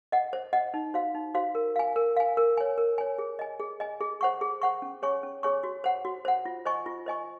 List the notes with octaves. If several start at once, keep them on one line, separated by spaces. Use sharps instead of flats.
D#5 F#5
C5
D#5 F#5
D#4
F#4 C5 F5
D#4
F#4 C5 F5
A#4
F5 G#5
A#4
F5 G#5
A#4
C#5 G#5
A#4
C#5 G#5
G#4
D#5 G#5
G#4
D#5 G#5
G#4
C5 F#5 C#6
G#4
C5 F#5 C#6
C#4
G#4 C#5 G#5 C#6
C#4
G#4 C#5 G#5 C#6
F#4
C5 F#5
F#4
C5 F#5
F4
C5 D#5 G#5 C#6
F4
C5 D#5 G#5 C#6